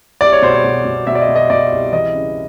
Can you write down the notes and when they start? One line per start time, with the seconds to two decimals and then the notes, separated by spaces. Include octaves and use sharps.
0.21 C2 D5
0.32 C#5
0.42 B2 C5
0.54 C#5
0.64 B2
0.85 B2
1.07 B2 E5
1.15 D5
1.22 D#5
1.28 B2
1.36 D#5
1.50 B2 D5
1.72 C2
1.92 E3 D#5
2.14 C#3